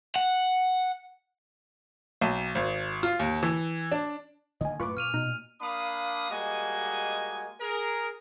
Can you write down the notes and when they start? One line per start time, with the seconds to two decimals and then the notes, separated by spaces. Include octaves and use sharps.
0.16 F#5
2.21 B1
2.55 G#1
3.03 F4
3.19 D#2
3.43 E3
3.92 D4
4.61 D3 D#3 A#3 D#5 G#5
4.80 F#2 A2 F4 B4 C#6 D6
4.97 A#2 F6 D#7 F7
5.14 B2 D#4
5.61 A#3 D4 F5 B5 D#6
6.31 G3 G#3 A#3 F#4 D#5 G#5
7.61 G#4 A#4